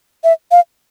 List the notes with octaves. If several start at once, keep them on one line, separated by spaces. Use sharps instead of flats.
E5
F5